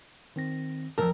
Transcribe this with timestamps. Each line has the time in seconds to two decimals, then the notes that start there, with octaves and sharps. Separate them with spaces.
0.36 D#3 C4 A#6
0.98 C2 F2 A#4 A5 E6